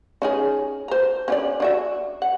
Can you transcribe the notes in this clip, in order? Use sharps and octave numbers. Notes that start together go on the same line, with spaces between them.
C#4 D#4 G#4
C5 A#5
C#4 D4 D5
D4 F#4 E5
F#5